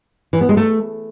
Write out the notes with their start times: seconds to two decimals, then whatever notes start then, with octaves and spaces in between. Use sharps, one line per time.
0.33 E3
0.41 B3
0.49 G#3
0.57 A3